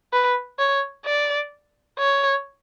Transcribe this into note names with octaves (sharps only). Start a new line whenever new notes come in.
B4
C#5
D5
C#5